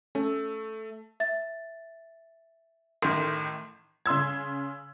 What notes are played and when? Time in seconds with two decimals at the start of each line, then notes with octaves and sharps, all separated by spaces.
0.15 A3 C#4 A4
1.20 E5 A6
3.02 A1 A2 D#3 C6
4.06 C#3 C6 E6 G#6